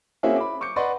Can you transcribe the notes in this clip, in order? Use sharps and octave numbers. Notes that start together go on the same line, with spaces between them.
A#3 C4 C#4 E4 F#4 G#4
B5 D6
C#6 D6 G6 C#7
B4 D5 D#5 F#5 C6 C#6